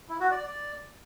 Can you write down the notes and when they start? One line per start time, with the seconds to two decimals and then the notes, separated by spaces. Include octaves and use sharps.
0.09 E4
0.20 F#4
0.32 D5
0.43 D5